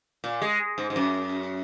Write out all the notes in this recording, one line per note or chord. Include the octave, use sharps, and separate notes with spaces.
A#2
G#3
G#2
G#2
F#2